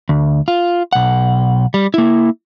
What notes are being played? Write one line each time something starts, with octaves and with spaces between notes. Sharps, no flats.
D2
F4
B1 F#5
G3
A#3 E4